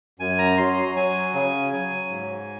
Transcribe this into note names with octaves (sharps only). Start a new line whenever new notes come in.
F#2 G#5
A#5
F#3 C6
F#3 G#5
C#3
F#3
G#2